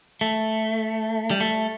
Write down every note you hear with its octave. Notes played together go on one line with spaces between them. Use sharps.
A3
G3
A3